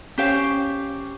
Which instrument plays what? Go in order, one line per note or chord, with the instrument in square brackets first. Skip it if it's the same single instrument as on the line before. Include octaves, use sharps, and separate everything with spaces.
[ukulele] C#4 G4 C5 F5